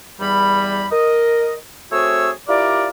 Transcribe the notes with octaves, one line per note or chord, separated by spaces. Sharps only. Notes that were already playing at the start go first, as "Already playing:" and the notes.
E2 G3 B5
A#4 D#5
A3 C4 F#4 G#4 C#5 E6
E4 F4 G4 A#4 D5